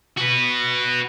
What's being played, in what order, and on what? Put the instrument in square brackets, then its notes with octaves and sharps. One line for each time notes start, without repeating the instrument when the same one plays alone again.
[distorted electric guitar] F#4 B4